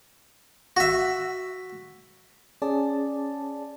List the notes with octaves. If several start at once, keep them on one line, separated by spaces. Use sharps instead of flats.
F#4 E5
C#4 G#4 D5 A5